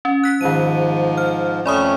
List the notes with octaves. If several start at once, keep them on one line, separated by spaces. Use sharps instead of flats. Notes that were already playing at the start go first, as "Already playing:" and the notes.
C#4
F#6 B6
G#2 D#3 F3 D#7
F6
F2 A3 C#4 D5 B5 D#6